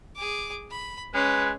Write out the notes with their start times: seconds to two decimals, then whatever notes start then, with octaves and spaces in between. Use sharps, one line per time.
0.16 G#4 D6
0.71 B5
1.14 G#3 C#4 B4